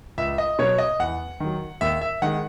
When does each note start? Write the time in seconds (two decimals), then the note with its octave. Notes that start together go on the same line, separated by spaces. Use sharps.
0.18 C#2 E5
0.38 D#5
0.59 B2 F#3 C#5
0.78 D#5
0.99 E2 F#5
1.40 D#3 F#3
1.81 D#2 E5
2.01 E5
2.22 D#3 G#3 F#5